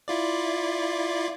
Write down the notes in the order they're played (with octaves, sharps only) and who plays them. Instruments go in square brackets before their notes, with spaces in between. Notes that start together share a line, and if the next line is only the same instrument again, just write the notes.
[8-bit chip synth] E4 F4 D5